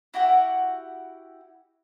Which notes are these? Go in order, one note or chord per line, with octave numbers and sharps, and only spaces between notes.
E4 F#4 G4 F#5